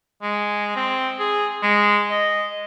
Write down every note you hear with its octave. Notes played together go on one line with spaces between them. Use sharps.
G#3
C4
G#4
G#3
D#5